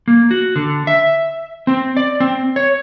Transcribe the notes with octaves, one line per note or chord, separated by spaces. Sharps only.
A#3
F#4
D3
E5
C4
D5
C4
C#5